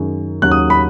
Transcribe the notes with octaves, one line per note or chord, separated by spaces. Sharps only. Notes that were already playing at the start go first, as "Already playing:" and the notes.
Already playing: F#2 D#3 G#3
D#2 C#3 F#3 F#6
D#6
B5